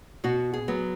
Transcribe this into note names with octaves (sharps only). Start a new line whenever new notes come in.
B2 F#4
G#4
F#3 B3